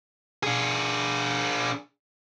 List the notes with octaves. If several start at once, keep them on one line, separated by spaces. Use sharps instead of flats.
D4 G#4